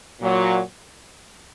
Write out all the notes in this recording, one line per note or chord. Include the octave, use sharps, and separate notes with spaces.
A#2 F#3